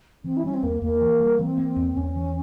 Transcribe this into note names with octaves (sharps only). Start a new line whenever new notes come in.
E3 C4
E4
G3 C#4
C4
E2 A#3
E2 A#3
E3
G3
E3 C4
A#3
E2
E2 C#4
E3